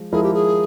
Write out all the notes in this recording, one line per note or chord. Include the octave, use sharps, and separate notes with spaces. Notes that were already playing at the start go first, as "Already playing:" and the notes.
Already playing: F3 G#3
F3 G#3 E4 G#4 A#4
G4
G#4